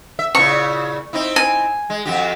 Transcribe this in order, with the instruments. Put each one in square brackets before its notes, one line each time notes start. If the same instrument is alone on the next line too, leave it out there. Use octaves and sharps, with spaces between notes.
[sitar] E5
[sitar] A#2 C#3 E4 [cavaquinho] C#6
[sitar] C4 D#4 E4
[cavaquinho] G#5
[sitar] G#3
F2 F#4 G4